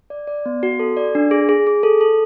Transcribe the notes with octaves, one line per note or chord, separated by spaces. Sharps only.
D5
D5
B3
F#4
A4
D5
D4
G#4
G#4
G#4
A4
A4